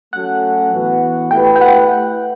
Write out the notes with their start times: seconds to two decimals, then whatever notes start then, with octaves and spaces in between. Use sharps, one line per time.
0.13 F#3 A3 C#4 F#4 A4 F#5
0.72 A2 E3 B3 F#4
1.31 A3 E4 G4 B4 G5
1.56 G5
1.61 F#5